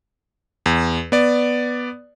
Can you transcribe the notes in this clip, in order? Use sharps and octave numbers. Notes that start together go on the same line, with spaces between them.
E2
B3 D5